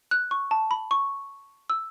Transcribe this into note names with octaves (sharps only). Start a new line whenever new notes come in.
F#6
C#6
A5
B5
C#6
E6